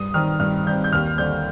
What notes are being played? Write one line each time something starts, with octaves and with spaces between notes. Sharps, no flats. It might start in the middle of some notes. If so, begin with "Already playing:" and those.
Already playing: G2 D#6
D#3 G3 C4 F6
G2 F6
D#3 G3 C4 G6
G6
D#2 F6
D3 G3 C4 G6